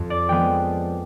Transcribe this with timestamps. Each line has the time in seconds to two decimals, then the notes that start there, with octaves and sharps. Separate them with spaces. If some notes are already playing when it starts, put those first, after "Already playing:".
Already playing: F2 F3
0.10 D5
0.29 F3 G#3 B3 G5